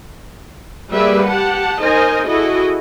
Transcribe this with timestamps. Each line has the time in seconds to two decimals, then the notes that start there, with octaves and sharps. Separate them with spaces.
0.90 G3 A#3 G#4 B4 D5 E5
1.27 G4 F#5 A5
1.80 D#4 A#4 C5 D#5 G#5
2.28 E4 F#4 G#4 A4 D#5